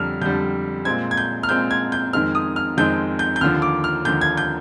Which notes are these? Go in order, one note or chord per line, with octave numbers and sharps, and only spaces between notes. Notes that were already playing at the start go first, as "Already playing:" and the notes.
Already playing: F2 D3 G3 F6
F2 D3 G3 G6
A#2 G#3 C4 G#6
G#6
G6
F6
A#2 G#3 C4 G6
G#6
G6
F2 D#3 G#3 C4 F6
D#6
F6
F2 D#3 G#3 C4 G6
G6
G6
D#2 D3 F3 F6
D6
F6
D#2 D3 F3 G6
G#6
G6